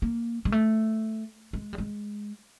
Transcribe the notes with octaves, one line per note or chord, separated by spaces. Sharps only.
A#3
G#3
A3
G#3
G3
G#3